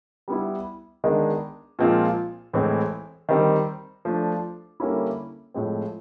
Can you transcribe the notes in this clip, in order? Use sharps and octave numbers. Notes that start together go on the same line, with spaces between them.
G3 B3 E4
D#3 G#3 B3 D4
A#2 F3 G#3 C4 F4
A2 E3 G#3 C4
D#3 G3 C4
F3 A3 D4
D3 G3 A#3 C#4 E4
A2 F3 G#3 C4